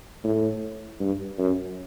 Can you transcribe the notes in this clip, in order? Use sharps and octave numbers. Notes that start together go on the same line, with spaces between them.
A2
G2
F#2